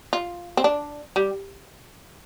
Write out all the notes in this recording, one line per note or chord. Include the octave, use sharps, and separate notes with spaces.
F4
C4
D4
G3